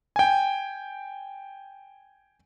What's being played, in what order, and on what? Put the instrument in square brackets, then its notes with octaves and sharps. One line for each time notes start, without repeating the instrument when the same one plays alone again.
[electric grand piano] G5 G#5